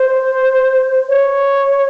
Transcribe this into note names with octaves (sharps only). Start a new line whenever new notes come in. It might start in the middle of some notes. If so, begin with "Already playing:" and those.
Already playing: C5
C#5